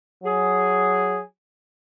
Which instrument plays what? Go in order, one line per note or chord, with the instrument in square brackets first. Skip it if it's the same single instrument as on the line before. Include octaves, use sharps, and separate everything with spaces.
[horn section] F#3 G#4